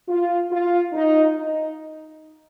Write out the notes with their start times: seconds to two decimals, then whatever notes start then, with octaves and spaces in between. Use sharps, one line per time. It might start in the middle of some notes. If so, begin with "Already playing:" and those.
0.08 F4
0.50 F4
0.93 D#4
1.36 D#4